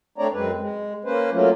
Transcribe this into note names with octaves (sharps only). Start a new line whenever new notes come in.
A3 C4 D4 C#5 D5 A#5
F#2 G#3 C4 B4
G#3
A#3 C#4 B4 C5
F#3 A3 A#3 C#4 F4